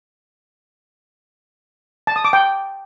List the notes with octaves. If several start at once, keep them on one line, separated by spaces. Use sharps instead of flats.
A5
D#6
D6
G5